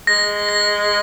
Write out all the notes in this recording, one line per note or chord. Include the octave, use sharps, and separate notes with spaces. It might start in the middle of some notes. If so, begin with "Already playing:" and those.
G#3 A#6
A#6